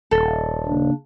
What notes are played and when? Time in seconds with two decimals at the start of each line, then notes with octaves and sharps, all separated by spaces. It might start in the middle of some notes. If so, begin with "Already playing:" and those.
0.11 D#1 A4
0.66 C#3 A#3 D4